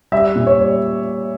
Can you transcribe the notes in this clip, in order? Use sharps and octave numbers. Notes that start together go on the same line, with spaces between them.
G3 E5
A#2
C#5
G3